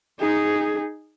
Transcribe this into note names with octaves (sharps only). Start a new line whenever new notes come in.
D#4 G#4